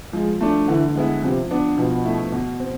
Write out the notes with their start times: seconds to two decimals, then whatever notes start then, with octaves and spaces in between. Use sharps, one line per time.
0.13 F3 G#3
0.41 A3 D4
0.68 D3 E3
0.95 G#3 B3 E4
1.23 C3 F3
1.51 B3 D4
1.78 B2 F3
2.05 A3 E4
2.32 B2
2.60 C4